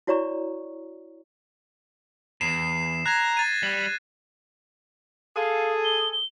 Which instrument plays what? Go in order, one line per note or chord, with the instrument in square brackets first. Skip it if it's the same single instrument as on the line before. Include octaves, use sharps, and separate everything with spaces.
[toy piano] E4 F#4 C#5 D5 A#5 C#6
[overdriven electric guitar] E2 [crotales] C7 E7
[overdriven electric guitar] A#5 [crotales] F#6 G#6 A#6
[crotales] A6 D#7
[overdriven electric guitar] G3
[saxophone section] G#4 A4 [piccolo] F5
[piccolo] G7
G7